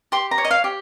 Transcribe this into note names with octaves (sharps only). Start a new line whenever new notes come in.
G4 C6
A#5
C#5
D#5
F5
G4